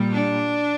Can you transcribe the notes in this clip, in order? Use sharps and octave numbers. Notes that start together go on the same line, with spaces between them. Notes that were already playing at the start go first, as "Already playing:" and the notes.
Already playing: A#2 G3
D4